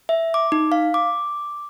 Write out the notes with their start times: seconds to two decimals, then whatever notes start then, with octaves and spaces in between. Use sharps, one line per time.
0.09 E5
0.34 D6
0.52 D#4
0.72 F5
0.94 D6